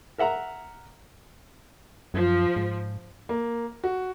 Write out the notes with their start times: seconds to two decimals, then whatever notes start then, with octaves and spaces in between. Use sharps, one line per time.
0.18 A#4 E5 F#5 A#5
2.14 F#2 F3
2.56 G#2
3.29 A#3
3.84 F#4